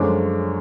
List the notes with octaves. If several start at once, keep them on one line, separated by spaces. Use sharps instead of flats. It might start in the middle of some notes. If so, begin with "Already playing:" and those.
Already playing: F#2 D3 F3 G#3 C#4 D6